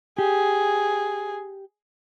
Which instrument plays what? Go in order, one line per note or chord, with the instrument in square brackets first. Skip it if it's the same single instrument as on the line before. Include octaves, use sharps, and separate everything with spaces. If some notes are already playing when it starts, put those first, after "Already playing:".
[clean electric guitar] G4 [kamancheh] G#4